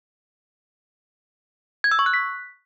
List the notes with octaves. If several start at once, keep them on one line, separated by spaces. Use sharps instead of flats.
G#6
E6
C#6
F#6
B6